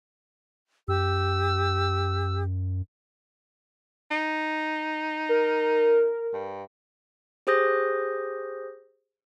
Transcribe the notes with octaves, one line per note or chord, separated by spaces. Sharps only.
F#2 G4 E6
D#4
A#4
G2
G4 G#4 C5 D#6 G6 A#6